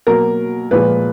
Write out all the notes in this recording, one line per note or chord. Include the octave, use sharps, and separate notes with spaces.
B2 F#3 A#3 A#4
A#2 F3 G#3 B4